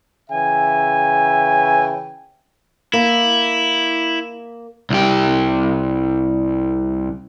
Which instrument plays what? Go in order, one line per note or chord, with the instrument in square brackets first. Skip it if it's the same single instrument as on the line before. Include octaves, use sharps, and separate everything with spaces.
[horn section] C#3 E3 E5 G5 G#5
[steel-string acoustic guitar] A#3 [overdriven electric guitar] E4
[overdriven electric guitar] C2 G4